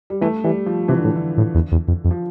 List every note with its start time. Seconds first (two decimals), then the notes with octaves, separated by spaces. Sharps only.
0.10 G3
0.21 E3 A3
0.44 E3 G3
0.66 F3
0.88 C3 E3
0.97 D3
1.05 A2
1.16 D3
1.37 A2
1.55 E2
1.72 E2
1.88 F2
2.05 F2
2.11 F3